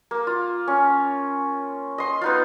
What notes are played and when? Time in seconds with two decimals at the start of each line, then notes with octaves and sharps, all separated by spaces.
0.11 A#3
0.27 F4
0.68 C#4
1.98 D#5 C6
2.21 B3 D#4 F4